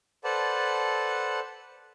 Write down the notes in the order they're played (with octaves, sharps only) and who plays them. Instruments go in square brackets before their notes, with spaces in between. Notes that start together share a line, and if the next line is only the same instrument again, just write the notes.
[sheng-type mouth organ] A4 B4 C5 D5 F#5 A5